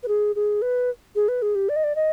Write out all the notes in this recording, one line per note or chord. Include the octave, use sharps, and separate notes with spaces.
B4
G#4
G#4
B4
G#4
B4
G#4
G4
D5
D#5
D5
D#5